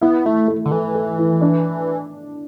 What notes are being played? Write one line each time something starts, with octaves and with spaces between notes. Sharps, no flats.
B3 E4
A3 E4
A3
D3
E3 A4
A4
E4
D4